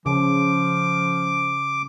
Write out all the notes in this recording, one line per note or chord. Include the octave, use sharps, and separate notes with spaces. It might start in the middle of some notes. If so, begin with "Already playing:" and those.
C#3 F3 D6